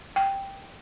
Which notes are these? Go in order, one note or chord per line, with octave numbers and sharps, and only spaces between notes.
G5